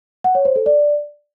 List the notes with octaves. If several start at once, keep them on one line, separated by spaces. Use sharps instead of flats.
F#5
C#5
C5
A4
D5